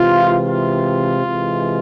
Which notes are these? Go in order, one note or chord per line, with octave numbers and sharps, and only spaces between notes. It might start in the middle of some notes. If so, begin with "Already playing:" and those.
Already playing: C3 E3 G#3 F4
F4
C3 E3 G#3